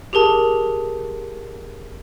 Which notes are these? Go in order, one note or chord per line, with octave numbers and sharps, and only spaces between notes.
G4 G#4 A#4 A5